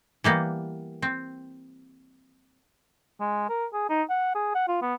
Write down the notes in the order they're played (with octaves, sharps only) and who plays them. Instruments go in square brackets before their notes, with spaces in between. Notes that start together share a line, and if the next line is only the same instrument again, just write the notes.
[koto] E3 G3 A#3 B3
C4
[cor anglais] G#3
A#4
G#4
D#4
F#5
G#4
F#5
F4
B3